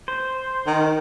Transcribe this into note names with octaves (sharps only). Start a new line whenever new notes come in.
C5
D#3